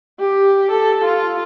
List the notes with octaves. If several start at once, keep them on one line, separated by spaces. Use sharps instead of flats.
G4
A4
F4